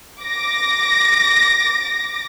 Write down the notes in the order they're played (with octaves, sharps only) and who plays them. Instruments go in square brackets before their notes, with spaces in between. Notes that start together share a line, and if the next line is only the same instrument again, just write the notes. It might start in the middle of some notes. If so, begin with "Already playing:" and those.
[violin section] D6 A#6